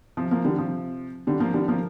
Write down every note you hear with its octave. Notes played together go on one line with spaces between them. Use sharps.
C3 F3
F3 A#3
D3 G3
C3 F3
D3 G3
F3 A#3
D3 G3
F3 A#3